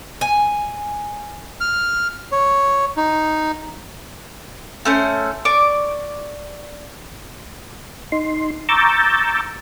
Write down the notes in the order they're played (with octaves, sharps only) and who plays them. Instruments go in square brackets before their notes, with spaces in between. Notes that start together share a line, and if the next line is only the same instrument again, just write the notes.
[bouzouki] G#5
[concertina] F6
C#5
D#4
[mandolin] A3 C#4 C5
D5 C#6 D6
[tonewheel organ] D#4 C6
A#5 C#6 D6 E6 G6 A6